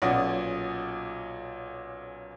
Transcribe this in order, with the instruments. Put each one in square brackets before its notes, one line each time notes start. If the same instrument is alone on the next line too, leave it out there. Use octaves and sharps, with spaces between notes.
[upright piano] B1 A#2 C#4 D5 F#5 D#6